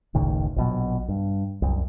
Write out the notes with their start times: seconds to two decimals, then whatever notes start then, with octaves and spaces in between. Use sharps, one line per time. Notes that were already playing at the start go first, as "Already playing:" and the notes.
0.15 F#1 C#2 A2 D#3
0.56 A#1 B2 F#3
1.09 G2
1.62 C2 F#2